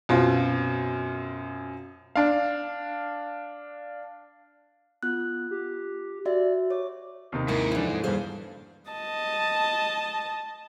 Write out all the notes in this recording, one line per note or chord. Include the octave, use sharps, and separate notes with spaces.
F#2 B2 C4 F4
D4 F5
B3 F4 F#6
G4
F#4 D5 E5
C#5 D6
D#2 C3 D#4
G#2 A#3 E4
F2 E3 D4 E4
E2 G2 G#4 C5 F5
D#5 A5